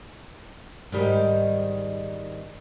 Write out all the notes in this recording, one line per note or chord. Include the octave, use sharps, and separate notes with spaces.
G#2 D#3 G3